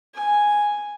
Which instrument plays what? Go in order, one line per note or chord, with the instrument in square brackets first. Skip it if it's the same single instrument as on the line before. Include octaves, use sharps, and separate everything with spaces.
[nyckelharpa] G#5